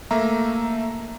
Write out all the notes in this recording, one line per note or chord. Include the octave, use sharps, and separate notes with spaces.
A3 A#3 E5 A#5